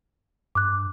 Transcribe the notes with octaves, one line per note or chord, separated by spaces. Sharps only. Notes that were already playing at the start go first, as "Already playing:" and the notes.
G2 D6 F#6